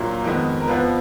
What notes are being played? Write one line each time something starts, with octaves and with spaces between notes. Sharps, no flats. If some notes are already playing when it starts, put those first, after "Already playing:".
Already playing: A#1 A#2 F#3 A#3
F2 D#3 G#3 B3
A#4
F2 F3 B3 B4